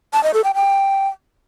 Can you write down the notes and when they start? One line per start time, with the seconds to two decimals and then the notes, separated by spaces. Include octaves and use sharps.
0.13 A5
0.24 D#5
0.34 A4
0.44 G5
0.54 G5